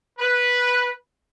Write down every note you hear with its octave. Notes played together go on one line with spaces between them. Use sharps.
B4